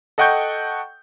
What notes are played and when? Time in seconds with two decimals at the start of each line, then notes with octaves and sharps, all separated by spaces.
0.18 A4 D#5 F#5 G5 C#6 G6